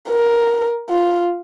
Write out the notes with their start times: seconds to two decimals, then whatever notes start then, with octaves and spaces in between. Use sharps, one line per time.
0.09 A#4
0.90 F4